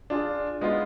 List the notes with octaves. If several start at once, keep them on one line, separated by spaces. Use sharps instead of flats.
D4 F4 G#4
G#3 B3 D#4 F4